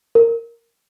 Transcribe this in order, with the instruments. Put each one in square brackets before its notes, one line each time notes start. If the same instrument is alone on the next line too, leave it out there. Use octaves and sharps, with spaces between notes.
[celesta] A#4